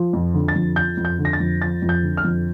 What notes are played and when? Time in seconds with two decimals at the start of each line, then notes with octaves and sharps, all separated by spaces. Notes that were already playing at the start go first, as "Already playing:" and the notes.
Already playing: F3
0.13 F2
0.34 D3
0.48 A6
0.55 F2
0.76 F3 G6
0.97 F2
1.05 G6
1.19 D3
1.25 A#6
1.33 A6
1.40 F2
1.61 F3 A6
1.82 F2
1.89 G6
2.03 D3
2.17 F6
2.24 F2